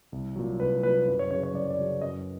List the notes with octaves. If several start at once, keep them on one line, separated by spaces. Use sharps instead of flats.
C2
A#2 F#3
C2 B4
A#2 F#3 B4
F#2 B4
C#5
C#3 F#3 C#5
C#5
F#2 D5
C#5
D5
C#3 F#3
F#2 D#5